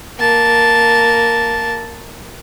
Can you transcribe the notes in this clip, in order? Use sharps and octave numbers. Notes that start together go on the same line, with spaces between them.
A#3 A5